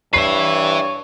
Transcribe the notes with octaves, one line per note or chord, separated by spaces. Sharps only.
G2 B4 C#5 E5 C7